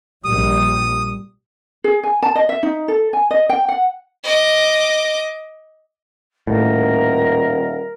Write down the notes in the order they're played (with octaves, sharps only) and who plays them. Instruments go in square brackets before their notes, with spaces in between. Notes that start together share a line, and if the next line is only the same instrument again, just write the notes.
[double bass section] A#1 G3 [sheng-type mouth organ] D#6
[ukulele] G#4
G#5
A5
D#5
E5
D#4
A4
G#5
D#5
G5
F#5
[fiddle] D#5 D6
[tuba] D#1 [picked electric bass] A2 [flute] A#4